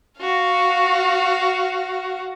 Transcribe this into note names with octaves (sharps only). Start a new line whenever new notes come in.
F#4 F5